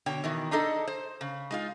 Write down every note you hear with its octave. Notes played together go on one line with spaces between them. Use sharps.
B2 D3 C#5 G5
B2 D#3 E3
D4 D#4 G#4 A4 D#5
C5
C#3
G#3 D#4 F4